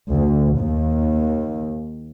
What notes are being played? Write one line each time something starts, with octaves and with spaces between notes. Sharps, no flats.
D2
D#2